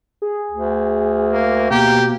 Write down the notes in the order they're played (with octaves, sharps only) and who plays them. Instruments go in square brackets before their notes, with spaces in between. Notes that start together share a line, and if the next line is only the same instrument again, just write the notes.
[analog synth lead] G#4
[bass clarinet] D2
[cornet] A#3
[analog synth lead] B2 [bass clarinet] A#3 [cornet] G4